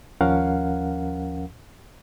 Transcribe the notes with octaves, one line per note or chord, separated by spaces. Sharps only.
D#2 F3 C#4 A#4 F5 F#5